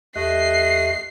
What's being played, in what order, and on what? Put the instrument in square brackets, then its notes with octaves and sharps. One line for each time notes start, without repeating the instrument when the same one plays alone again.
[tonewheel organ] E2 G4 F#6 [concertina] A3 D#5 [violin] C7